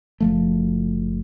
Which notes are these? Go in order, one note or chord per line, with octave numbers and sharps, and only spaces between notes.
F#1 F3 A3